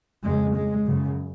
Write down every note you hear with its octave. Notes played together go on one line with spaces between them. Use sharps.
F2 C#3 G#3
G#3
F#2 C#3